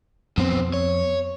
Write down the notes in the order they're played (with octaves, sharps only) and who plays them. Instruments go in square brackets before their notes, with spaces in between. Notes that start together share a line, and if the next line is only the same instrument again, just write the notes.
[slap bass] F2 B3 [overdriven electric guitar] B2 C4
[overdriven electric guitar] C#5